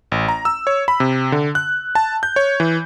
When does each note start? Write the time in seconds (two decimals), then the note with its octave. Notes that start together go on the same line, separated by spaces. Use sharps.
0.12 A1
0.28 A#5
0.45 E6
0.67 C#5
0.88 B5
1.00 C3
1.32 D3
1.55 F#6
1.95 A5
2.23 G6
2.36 C#5
2.60 E3